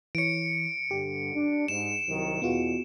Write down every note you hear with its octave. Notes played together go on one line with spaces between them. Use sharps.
E3 C#5 C#7 D7
G2 D3 G4
D4
G#2 E7
C2 D#3 F#3
E2 B2 B3 F4 F#4